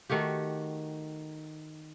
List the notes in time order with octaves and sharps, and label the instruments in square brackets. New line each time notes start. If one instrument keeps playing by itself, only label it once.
[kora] D#3 A3 F#4 G4